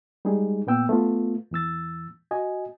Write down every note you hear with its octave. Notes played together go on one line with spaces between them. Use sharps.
G3 G#3 D#4 G#4
A#2 B3 G5 E6
A3 B3 F4
E2 E3 E6 A6
F#4 D#5 G#5